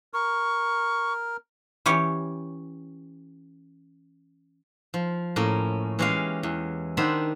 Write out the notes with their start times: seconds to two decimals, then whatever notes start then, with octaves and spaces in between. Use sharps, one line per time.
0.14 A#4 C#6
1.86 E3 C#4 G4 C#5
4.94 F3
5.36 A2 A#3 C#4
5.99 E3 G#3 C#4 G4 F5
6.43 E2
6.97 D#3 D4 C5 E5 F#5 B5